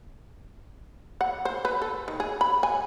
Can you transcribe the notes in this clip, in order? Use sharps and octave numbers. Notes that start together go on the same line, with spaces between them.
F#5
C5
B4
A4
D#3
G#4
B5
G#5